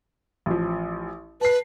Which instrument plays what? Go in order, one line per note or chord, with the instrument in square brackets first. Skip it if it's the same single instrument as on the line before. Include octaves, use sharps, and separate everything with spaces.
[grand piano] A1 F3
[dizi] B4 [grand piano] A5 C7